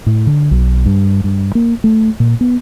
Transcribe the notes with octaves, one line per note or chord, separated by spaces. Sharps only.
A2
D3
B1
G2
G2
A#3
A3
A#2
B3